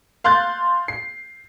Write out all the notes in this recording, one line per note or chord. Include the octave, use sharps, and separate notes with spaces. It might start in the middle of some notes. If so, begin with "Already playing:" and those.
F5 C6 F#6 G6 A6
C7